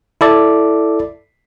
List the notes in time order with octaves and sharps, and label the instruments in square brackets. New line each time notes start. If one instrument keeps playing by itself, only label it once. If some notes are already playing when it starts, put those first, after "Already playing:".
[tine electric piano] E4 A4 D5